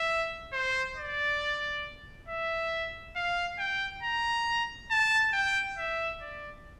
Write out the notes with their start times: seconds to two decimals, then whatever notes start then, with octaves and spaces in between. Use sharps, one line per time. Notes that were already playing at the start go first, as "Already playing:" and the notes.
Already playing: E5
0.53 C5
0.97 D5
2.28 E5
3.16 F5
3.59 G5
4.03 A#5
4.90 A5
5.33 G5
5.78 E5
6.22 D5